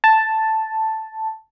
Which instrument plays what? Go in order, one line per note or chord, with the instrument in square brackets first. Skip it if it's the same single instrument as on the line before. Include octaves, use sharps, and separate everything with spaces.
[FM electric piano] A5